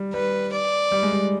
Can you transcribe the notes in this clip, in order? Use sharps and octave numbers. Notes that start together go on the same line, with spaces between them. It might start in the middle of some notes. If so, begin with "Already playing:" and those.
Already playing: G3
G3 B4
D5
G3
G#3
G3